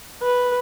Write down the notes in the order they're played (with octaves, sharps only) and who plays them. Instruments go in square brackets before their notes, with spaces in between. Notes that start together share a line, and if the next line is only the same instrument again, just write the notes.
[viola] B4